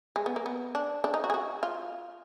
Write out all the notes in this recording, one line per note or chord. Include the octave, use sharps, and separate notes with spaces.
G#3
B3
A#3
B3
D4
D4
D#4
F#4
G#4
F#4
F4